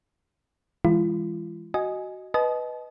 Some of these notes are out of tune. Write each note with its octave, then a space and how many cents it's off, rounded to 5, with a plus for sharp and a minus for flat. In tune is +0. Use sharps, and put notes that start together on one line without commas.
E3 +0 G#3 -30 F4 -40
F#4 +10 D#5 +0 G#5 +5
B4 +0 D#5 +0 A5 -40